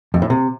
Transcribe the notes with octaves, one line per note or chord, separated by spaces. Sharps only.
F2
A2
C3